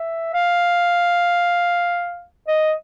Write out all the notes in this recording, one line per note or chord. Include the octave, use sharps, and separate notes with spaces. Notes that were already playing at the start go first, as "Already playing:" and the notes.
Already playing: E5
F5
D#5